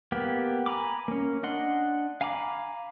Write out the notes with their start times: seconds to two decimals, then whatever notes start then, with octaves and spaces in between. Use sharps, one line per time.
0.12 A#3 B3 G4
0.66 G#5 A#5 B5 D6
1.08 A#3 C#4
1.43 D4 D#5 F#5 C6
2.21 F5 G#5 A#5 B5 D6